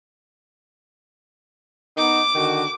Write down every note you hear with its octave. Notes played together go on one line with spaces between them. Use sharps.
B3 D#4 D6
D3 D#3 F#4